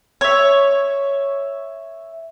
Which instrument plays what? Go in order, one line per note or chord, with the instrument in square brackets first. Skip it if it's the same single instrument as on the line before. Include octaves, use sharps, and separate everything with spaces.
[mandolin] C#5 E5